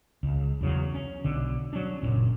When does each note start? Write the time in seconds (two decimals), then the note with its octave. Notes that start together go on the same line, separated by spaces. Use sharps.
0.23 C#2
0.61 E2 C#3 F#3
0.94 C#4
1.24 B1 D3
1.73 F#3 C#4 D4
2.01 F#1 C2 A#2 C#4